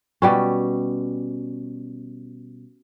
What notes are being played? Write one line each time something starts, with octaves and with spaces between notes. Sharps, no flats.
B2 G3 C#4